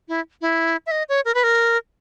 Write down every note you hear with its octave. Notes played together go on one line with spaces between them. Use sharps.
E4
E4
E5
D#5
C#5
A#4
B4
A#4